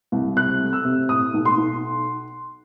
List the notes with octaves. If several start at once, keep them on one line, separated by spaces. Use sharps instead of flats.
C2
C3 F#6
A3
E6
C3
A2 D#6
B1
C6
B1